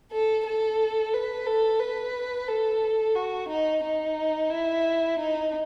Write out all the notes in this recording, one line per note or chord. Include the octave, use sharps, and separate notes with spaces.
A4
A4
B4
A4
B4
A4
F#4
D#4
D#4
E4
D#4